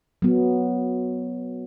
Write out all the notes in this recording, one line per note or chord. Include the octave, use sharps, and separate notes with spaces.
F#3 B3